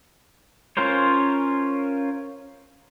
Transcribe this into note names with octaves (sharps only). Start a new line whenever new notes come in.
C#4 F4 A#4 C5 C#5